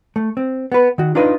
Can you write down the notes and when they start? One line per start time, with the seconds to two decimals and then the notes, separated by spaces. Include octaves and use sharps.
0.16 A3
0.37 C4
0.72 B3 B4
0.98 D#3 F#4
1.15 D4 D#4 F4 B4 C#5 D#5